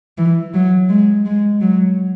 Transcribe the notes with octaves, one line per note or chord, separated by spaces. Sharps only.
E3
F#3
G#3
G#3
F#3